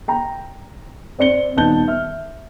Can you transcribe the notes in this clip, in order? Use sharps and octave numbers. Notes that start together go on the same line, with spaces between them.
G5 A#5
C4 D5 C#7 G7
D#1 B3 D#4 A5 G6 G7
E5 F6